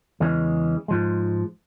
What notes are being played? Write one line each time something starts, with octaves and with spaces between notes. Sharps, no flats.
E2 C#3 E3 G#3 C#4
G#2 F3 G#3